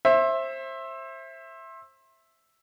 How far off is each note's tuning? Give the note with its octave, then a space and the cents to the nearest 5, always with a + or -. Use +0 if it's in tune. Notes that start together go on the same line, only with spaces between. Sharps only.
C5 +30 E5 +0